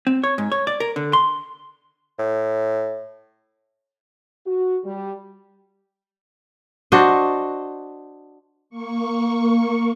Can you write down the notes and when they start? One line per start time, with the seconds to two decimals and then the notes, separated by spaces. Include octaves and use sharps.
0.07 C4
0.24 C#5
0.38 G#2
0.52 C#5
0.67 D5
0.80 A#4
0.96 D3
1.13 C6
2.19 A2
4.45 F#4
4.84 G3
6.92 D4 F#4 C5 D#5
8.70 A#3 C#6